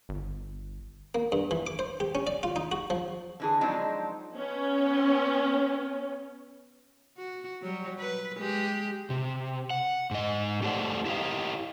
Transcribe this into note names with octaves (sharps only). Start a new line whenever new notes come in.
G1
A#3
G2
E3
D6
C5
G4
C#4
D5
F4
D#4
F#4
F3
D3 E3 G#4
F3 F#3 G#3 C4 D4 D#4
B3 C#4
F#4
F#3 G3
B4
G#3 G4
C3
F#5
G#2 D#5
A3 G4 A4 C5 D5 F#5
E4 G4 A4 D#5 F5